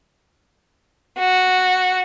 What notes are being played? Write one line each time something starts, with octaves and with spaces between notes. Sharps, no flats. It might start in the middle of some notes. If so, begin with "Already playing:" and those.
F#4